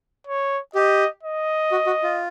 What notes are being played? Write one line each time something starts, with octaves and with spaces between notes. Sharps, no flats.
C#5
G4 D#5
D#5
F#4
F#4
F4